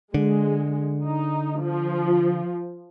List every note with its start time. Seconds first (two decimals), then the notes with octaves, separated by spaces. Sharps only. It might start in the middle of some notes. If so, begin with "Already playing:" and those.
0.14 D3 G#3
1.05 D#4
1.62 F3